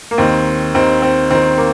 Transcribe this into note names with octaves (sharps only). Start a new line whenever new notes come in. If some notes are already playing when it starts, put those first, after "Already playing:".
A#3
D#2 D#3 C4
D#2 D#3 C4
C4
D#2 D#3 C4
A#3